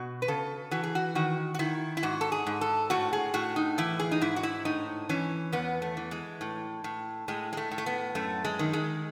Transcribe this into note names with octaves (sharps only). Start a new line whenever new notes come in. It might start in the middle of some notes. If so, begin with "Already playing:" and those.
Already playing: B2 F#4
B4
C#3 A4
E3 F#4
G#4
F#4
D#3 F#4
F#4
D#3 E4
E4
G#2 F#4
A4
G#4
G#2
A4
A2 F#4
G#4
A2 F#4
D#4
E3 E4
G#4
D#4
G#2 E4
F#4
E4
A2 D#4
E3 C#4
E2 B3
A3
E3
G#3
A2
A2
A2 G#3
G#3
A3
A2
A3
B3
F#2 A3
G#3
D#3
G#3